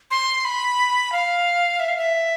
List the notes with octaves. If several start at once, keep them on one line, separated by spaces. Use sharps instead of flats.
C6
B5
F5
E5
F5
E5